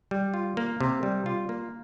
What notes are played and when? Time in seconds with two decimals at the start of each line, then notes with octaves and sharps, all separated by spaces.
0.11 G3
0.34 F4
0.57 A#3
0.80 C3
1.03 G3
1.26 F4
1.49 A#3